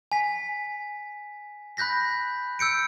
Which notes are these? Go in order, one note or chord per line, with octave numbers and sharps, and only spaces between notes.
G#5 B6
B5 F#6 G6 A#6 B6
E6 G6 C#7 D7